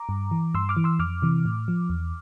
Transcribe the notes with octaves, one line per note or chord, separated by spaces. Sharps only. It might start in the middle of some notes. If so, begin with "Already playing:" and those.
Already playing: A#5 D6
G2
E3
G2 C6 E6
D6 F6
E3
C6 E6
F2 D6 F6
C3 E3
A2
F3
E2